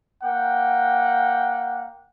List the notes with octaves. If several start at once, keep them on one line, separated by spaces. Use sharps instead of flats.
A#3 F#5 G5